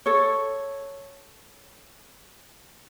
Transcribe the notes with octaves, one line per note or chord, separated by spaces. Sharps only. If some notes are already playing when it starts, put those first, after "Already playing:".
A4 C#5